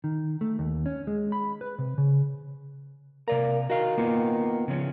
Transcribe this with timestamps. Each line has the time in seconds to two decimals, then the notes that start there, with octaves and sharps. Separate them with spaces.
0.04 D#3
0.41 A3
0.59 D#2
0.86 C#4
1.07 G#3
1.32 B5
1.61 B4
1.79 C3
1.98 C#3
3.28 C3 A#3 D5 A#5
3.70 D#3 F#4 F5
3.98 A#3 B3 F4
4.68 C#3 F3 C#4